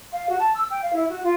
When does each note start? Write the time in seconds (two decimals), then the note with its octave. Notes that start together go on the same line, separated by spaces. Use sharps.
0.11 F5
0.28 F#4
0.40 A5
0.56 E6
0.70 G5
0.83 F5
0.95 E4
1.10 F#4
1.23 F4